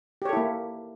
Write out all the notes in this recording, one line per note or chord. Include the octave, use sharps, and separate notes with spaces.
A#3 E4 G4 A4 C#5